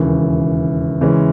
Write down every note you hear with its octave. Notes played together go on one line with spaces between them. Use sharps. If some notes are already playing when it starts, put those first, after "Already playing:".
Already playing: E1 D#2 C#3 E3
C#3 E3 G#3 C#4